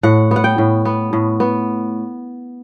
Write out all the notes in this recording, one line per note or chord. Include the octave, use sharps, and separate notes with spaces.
A2 F#5
B3 F#5
G5
A2
B3
A2
B3